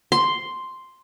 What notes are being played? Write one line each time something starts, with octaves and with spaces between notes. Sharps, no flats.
C6